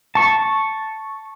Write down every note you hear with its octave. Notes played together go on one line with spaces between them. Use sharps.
A5 C#6